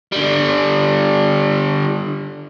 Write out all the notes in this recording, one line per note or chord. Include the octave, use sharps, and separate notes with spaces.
D3 G3